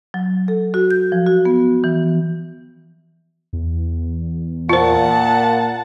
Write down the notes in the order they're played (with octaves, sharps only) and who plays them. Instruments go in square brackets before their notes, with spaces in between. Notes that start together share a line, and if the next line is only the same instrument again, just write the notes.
[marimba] F#3
A4
F#4
G6
F3
F#4
B3
E3
[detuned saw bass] E2
[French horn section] A#2 [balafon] F4 C5 [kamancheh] F#5 A5